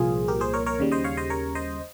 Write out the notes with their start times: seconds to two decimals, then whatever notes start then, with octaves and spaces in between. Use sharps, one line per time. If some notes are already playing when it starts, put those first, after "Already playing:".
Already playing: C2 A#2 F3 F4 G#4
0.28 G4 A#4
0.41 G#4 C5
0.53 A#4 C#5
0.66 A#4 C#5
0.79 D#2 C#3 G3
0.92 C5 D#5
1.04 C#5 F5
1.17 C5 D#5
1.30 A#4 C#5
1.55 C5 D#5